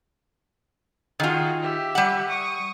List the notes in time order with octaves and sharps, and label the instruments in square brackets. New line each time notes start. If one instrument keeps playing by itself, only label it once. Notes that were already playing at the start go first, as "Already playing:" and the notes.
[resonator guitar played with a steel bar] D#3 F4 [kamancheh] F#4 G#4
[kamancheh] G4 E5
[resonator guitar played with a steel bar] G3 F#5
[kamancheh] C#6 D#6